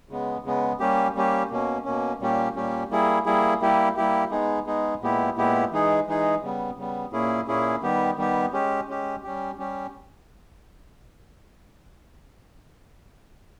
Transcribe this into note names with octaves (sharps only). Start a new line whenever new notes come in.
C#3 G#3 B3
C#3 G#3 B3
G3 A#3 C#4 G4
G3 A#3 C#4 G4
B2 A#3 C#4
B2 A#3 C#4
A#2 G3 A#3 C#4 G4
A#2 G3 A#3 C#4 G4
G3 A#3 E4 G#4
G3 A#3 E4 G#4
G3 A#3 E4 G4
G3 A#3 E4 G4
G#3 B3 D#4 G#4
G#3 B3 D#4 G#4
A#2 G#3 B3 E4 G4
A#2 G#3 B3 E4 G4
E3 G#3 D#4 G#4
E3 G#3 D#4 G#4
C#3 G3 B3
C#3 G3 B3
A#2 A#3 C#4 E4 G#4
A#2 A#3 C#4 E4 G#4
D#3 G3 B3 G4
D#3 G3 B3 G4
G#3 C#4 G4
G#3 C#4 G4
G3 C#4 G4
G3 C#4 G4